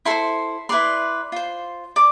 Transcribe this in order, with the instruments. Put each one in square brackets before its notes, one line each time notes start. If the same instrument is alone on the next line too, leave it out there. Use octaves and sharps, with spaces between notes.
[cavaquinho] E4 A4 C5 C6
E4 B4 D5 C6
F4 C5
D5 D6